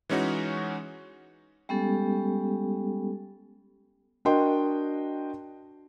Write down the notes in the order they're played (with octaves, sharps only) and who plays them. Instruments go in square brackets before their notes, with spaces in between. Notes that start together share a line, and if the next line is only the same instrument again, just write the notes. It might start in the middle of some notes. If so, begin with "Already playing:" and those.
[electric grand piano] E3 G#3 C#4 D#4 F#4
[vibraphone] G3 G#3 B3 C#4 G4 A4
[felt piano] D4 F#4 A#4 D#5 G5 C6